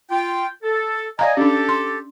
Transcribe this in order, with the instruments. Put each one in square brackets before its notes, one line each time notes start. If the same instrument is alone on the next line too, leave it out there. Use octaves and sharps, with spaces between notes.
[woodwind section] F4 G5
A4
[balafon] D5 F5 A#5 [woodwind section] D#5 G#5
[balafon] C#4 D4 [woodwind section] G4 A4
[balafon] C6